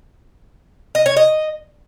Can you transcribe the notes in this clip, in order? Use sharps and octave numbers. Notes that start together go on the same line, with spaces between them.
D#5
C#5
D#5